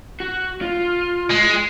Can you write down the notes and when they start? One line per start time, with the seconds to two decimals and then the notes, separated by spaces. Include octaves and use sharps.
0.20 F#4
0.61 F4
1.31 G#3